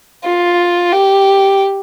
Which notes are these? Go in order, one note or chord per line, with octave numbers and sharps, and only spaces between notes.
F4
G4